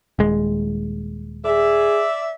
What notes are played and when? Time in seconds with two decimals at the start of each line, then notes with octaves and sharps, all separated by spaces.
0.19 D#1 G#3
1.45 G#4 D5 E5